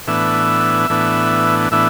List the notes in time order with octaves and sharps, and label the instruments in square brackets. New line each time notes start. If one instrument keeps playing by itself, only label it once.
[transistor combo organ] A2 E3 B3 D4 E5
A2 E3 B3 D4
A2 E3 B3 D4 E5